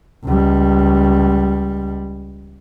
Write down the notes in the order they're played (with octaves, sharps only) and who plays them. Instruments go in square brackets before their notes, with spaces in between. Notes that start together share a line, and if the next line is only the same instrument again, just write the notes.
[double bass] C#2 G3